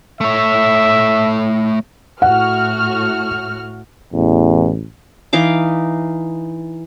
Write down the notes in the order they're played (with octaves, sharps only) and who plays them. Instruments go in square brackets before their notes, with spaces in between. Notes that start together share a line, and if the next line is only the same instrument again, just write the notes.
[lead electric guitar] A3 C#5 [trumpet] E5
[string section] A2 F#4 F6 [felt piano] F#5
[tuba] A1 [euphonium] E2
[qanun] E3 D#4 F5 D6